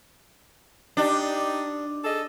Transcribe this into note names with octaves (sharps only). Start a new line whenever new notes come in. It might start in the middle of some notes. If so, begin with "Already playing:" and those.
D4 D#4 G4
G#4 A4 D#5